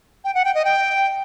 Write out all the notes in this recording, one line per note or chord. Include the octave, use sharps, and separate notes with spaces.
G5
F#5
G5
D#5
G5